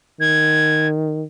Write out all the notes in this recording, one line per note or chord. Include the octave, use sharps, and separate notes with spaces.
D#3 G#6